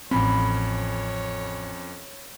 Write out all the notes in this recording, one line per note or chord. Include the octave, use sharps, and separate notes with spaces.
A1 F2 C4 C#4 C#5 B5